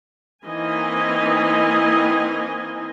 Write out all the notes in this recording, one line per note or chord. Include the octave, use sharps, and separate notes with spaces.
E3 A#3 C4 D#4 D#5 G#5